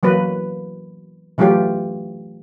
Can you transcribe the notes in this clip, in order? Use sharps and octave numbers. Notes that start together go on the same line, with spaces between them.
E3 F#3 A#3 B4
E3 F#3 A3 F4 G4 C#5